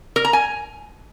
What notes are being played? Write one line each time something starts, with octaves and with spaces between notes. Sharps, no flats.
A#4
A#5
G#5